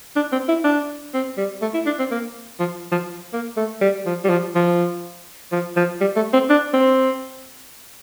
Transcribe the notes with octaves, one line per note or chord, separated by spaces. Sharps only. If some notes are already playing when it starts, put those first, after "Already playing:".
D4
C4
E4
D4
C4
G3
A3
E4
D4
C4
A#3
F3
F3
A#3
A3
G3
F3
G3
F3
F3
F3
F3
G3
A3
C4
D4
C4